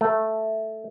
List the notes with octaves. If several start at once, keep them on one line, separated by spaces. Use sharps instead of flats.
A3